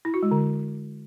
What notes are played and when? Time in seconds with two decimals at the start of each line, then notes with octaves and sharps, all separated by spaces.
0.05 E4
0.14 F#4
0.23 G#3
0.31 D3